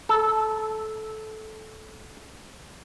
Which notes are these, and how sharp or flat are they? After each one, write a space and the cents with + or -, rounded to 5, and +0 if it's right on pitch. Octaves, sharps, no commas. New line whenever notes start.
A4 -15